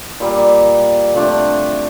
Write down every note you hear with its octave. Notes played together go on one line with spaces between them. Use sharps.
A#2 G3 A#3
C3 F3 A3 D4